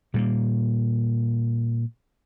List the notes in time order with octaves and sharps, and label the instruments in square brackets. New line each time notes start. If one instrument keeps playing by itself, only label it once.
[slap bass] A#2 G3 G#3 A#3